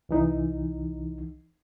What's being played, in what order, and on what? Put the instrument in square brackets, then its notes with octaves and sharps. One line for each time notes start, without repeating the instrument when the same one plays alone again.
[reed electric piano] C2 E3 D#4